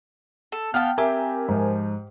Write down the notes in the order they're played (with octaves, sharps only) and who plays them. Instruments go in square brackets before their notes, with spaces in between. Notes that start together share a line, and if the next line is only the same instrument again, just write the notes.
[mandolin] A4
[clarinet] B3 [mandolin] F5 G5 A5 [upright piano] F6
[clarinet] C4 [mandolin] G4 C6 D6 [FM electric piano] A#4 G#5 [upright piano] E5
[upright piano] G#2 [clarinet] F3